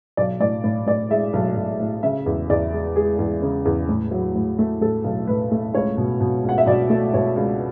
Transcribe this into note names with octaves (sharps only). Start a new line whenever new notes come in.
B1 D5
A2 D5
A2
A2 D5
G#3 E5
B1
B1
A2
C#3 E5
E2
E2 D5
G#3
G#3 G#4
E2
C#3
E2
A2
F#3
A2
A3
A2 A4
B1
A2 B4
A3
C#2 C#5
B2
B2
C#2
F#5
E5
B2 D5
A3
B2 C#5
C#2